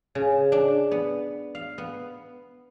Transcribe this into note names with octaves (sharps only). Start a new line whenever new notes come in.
C#3
D4
B3
F5
B3